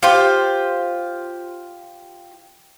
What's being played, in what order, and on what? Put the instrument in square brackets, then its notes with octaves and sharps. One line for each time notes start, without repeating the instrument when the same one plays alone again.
[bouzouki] F4 G4 C5